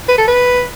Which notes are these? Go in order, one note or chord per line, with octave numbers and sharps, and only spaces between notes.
B4
A4
B4